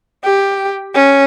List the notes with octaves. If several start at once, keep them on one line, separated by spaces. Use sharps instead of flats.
G4
C#4